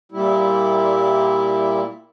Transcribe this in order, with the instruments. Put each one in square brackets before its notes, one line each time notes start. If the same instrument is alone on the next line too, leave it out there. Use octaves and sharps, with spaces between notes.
[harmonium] A#2 G3 E4